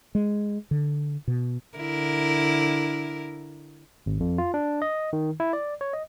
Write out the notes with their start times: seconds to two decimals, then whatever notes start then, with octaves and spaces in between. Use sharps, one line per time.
0.15 G#3
0.71 D3
1.27 B2
1.78 D3 E4 A#4
4.06 G#1
4.20 F2
4.38 F4
4.54 D4
4.82 D#5
5.13 D#3
5.40 E4
5.53 D5
5.81 C#5
5.93 D#5